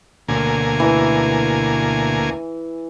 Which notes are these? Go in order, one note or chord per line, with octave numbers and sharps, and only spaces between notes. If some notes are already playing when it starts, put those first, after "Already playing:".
D2 B2 A#3 A#4 G#5
E3